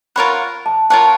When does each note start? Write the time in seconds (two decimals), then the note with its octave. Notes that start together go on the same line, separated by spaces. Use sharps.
0.16 F4 A#4 C#5 F#5 B5
0.66 A5
0.90 F4 A#4 C#5 F#5 A5